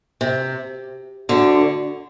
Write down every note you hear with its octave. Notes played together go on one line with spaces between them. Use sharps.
C3
D2 D3